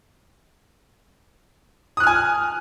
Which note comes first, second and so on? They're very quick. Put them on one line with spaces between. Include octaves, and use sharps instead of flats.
D#6 F#6 F6 G#5